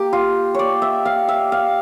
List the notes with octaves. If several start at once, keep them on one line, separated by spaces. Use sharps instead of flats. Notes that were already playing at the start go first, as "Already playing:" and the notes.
Already playing: A#3 G4
F4
C#5 D5
E5
F5
E5
F5